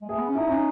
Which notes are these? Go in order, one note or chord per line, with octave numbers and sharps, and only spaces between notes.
G#3
A3 G#4
B3
C#4
D#4 E4
C#4 D#4